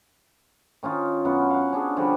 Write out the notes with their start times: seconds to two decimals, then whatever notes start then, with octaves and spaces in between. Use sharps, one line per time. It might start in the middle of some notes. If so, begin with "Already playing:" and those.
0.83 D#3 C#4 D#4 F4
1.25 F#2 B3 C#4 F#5
1.50 F5 F#5
1.73 C#4 D4 G#4
1.97 D3 F3 G3 F#4